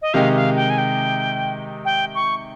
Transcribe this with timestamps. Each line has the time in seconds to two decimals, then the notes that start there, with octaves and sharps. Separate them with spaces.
0.02 D#5
0.14 C3 D#3 G#3 D#4 G4 F5
0.35 F5
0.56 G5
0.70 G#5
0.78 G5
1.85 G5
2.15 C#6